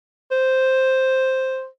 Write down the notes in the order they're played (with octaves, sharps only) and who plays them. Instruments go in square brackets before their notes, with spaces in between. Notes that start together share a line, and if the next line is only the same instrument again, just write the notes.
[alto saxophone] C5